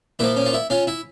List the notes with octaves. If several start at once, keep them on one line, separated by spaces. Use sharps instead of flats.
A#2 F3 E4
C#4
F4
E4
C#4 F4
E4